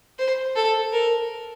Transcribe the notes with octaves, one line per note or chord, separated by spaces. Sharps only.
C5
A4
A#4